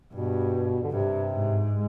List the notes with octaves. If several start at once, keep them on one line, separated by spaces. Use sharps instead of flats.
G2 B2
D3
G2 C3
G#2
G#3